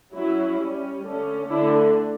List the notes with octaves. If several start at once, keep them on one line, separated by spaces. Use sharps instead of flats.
F#3 C#4 E4
G3 C#4
D3 A3 C#4
D3 A3 D4 E4